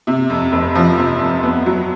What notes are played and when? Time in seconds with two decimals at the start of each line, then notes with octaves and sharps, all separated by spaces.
0.07 C3
0.30 F2
0.52 F1
0.75 F3
0.98 C3
1.21 F2
1.43 B3
1.66 F#3